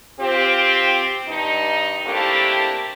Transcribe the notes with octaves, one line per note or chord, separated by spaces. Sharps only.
C4 F4 G4
G2 D#4
A3 A#3 C4 D4 E4 G4